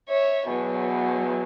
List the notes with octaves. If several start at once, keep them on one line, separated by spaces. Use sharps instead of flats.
C#5 E5
E2 B2 F#3